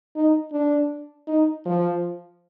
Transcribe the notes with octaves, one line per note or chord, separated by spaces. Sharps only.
D#4
D4
D#4
F3